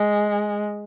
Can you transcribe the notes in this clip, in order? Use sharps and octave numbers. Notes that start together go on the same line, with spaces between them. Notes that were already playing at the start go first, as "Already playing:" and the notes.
Already playing: G#3